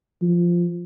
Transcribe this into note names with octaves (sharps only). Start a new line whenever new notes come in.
F3